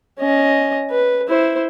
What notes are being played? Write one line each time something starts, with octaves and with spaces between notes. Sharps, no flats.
C#4 D#5
B4
E4 C5